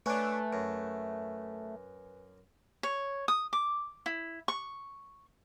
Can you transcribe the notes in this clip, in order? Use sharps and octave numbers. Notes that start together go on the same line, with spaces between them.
A3 D4 B4 C#5 G#5 F#6
F#2
C#5
D#6
D6
E4
C#6